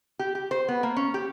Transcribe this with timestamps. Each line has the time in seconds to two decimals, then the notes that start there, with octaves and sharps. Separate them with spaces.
0.19 G4
0.35 G4
0.51 C5
0.68 B3
0.83 A#3
0.96 C#4
1.14 G4